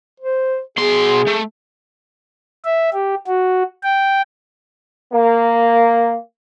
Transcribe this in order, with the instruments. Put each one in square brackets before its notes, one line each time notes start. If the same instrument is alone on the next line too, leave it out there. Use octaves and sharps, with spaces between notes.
[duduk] C5
[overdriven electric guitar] B2 C6 [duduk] G#4
[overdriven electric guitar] A3
[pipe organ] E5
G4
F#4
G5
[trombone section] A#3